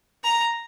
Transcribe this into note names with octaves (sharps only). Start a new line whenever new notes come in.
A#5